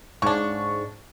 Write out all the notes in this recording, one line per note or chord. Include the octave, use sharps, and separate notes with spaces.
G#2 C#3 D4 C#6